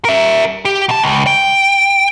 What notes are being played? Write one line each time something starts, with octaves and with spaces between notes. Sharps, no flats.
A#4 E5
G4
B2 A5
C#2
G5